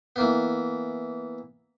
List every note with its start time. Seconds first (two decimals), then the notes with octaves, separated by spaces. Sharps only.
0.16 E3 A#3 B3